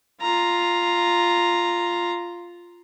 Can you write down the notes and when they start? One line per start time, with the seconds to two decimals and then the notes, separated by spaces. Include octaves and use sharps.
0.21 F4 A#5